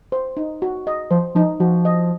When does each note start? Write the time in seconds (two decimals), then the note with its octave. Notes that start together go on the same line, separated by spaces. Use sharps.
0.12 C5
0.37 D#4
0.62 F#4
0.87 D#5
1.11 F3 C5
1.35 F3 D#4
1.60 F3 F#4
1.85 D#5